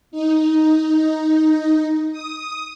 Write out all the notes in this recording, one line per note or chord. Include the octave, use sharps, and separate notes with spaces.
D#4
D#6